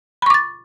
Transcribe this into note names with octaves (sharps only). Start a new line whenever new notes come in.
B5 C#6 D6 A6